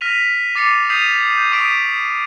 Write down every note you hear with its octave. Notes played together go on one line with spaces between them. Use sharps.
F6 A#6 B6 D#7 F7
D6 A6 C7 C#7 D#7
D#6 G6 B6 C7 D#7 F7
G6
C#6 D#6 B6 D7 D#7